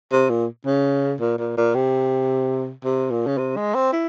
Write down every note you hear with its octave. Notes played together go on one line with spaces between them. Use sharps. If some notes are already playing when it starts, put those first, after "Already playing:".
C3
A#2
C#3
A#2
A#2
A#2
C3
C3
A#2
C#3
C3
G#3
C4
E4